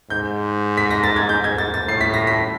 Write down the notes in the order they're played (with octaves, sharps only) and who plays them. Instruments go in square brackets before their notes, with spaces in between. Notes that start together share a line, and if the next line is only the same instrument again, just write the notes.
[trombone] G#2 [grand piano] G6
[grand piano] B6
A#6
A6
G#6
G6
G#6
A6
A6
[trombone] A2 [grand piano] C7
[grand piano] B6
A#6
B6